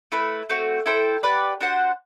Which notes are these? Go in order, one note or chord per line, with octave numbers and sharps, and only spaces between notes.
A3 E4 B4
A3 C4 F#4
E4 A4 C5 G5
G4 B4 D5 F#5
D4 F#4 C5 F#5